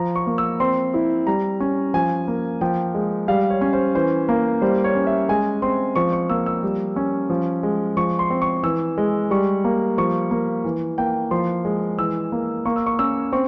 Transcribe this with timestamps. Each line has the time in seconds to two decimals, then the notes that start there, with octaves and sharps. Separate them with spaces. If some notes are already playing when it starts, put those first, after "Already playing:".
Already playing: F3 A#5
0.16 C#6
0.27 A#3
0.38 E6
0.60 C4 C6
0.94 E4
1.27 G3 A#5
1.60 C#4
1.94 F3 G#5
2.28 A#3
2.61 F3 G5
2.94 G#3
3.28 G3 F5
3.50 C#5
3.61 C#4
3.73 C5
3.95 E3 C5
4.29 A#3
4.62 G3 C5
4.84 C#5
4.95 C#4
5.07 E5
5.29 G#3 G#5
5.62 C4 C6
5.96 F3 C#6
6.13 C#6
6.30 A#3 E6
6.46 E6
6.63 G3
6.96 C#4
7.30 F3
7.63 G#3
7.97 F3 C#6
8.19 C6
8.30 C4
8.42 C#6
8.63 E3 E6
8.98 G#3
9.31 G3 C#6
9.64 A#3
9.98 F3 C#6
10.31 A#3
10.65 E3
10.98 A#3 G5
11.31 F3 C6
11.65 G#3
11.99 E3 E6
12.32 A#3
12.65 A#3 C#6
12.76 E6
12.86 C#6
12.99 C#4 E6
13.32 C4 C#6